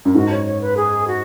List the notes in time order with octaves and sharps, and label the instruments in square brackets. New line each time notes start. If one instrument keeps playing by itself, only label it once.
[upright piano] F#2
[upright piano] G#2 [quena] F#4
[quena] C#5
C#5
B4
G#4
F#4